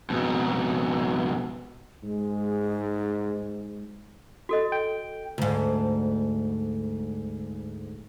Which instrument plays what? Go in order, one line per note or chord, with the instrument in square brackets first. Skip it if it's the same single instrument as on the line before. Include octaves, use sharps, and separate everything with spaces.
[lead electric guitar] F2 G#2 [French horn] B2
[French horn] B2
[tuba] G#2 [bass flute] G#3
[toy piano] F#4 A4 D#5
[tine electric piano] G5
[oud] D2 G#2